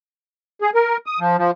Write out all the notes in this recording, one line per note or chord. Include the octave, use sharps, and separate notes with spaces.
G#4
A#4
D#6
F3
F3